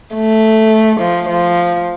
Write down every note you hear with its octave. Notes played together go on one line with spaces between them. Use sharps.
A3
F3
F3